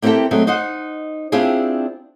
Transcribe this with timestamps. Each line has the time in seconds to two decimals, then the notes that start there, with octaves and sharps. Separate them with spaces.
0.02 A#3 C4 E4 G4 A4 G5
0.31 F#3 G#3 A3 C4
0.47 D#4 C5 D#5 F#5
1.32 C4 D4 E4 F4 G4 G#4